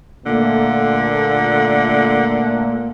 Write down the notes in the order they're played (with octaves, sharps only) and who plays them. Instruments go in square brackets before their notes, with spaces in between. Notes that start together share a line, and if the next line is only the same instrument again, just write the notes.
[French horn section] A#2 A3 [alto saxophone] D3 [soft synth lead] A#3